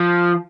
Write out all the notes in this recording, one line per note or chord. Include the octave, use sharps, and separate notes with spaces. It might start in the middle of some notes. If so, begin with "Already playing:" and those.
Already playing: F3